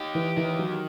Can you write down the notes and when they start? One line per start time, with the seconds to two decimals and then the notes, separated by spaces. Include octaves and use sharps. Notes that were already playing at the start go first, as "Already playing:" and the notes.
Already playing: D#4 G4
0.15 E3
0.36 D#3 E3
0.59 F#3